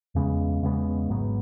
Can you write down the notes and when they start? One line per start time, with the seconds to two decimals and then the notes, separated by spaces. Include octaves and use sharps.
0.15 E2 C#3 G#3 B3
0.62 E2 C#3 G#3 B3
1.09 G#1 G#2 F#3 B3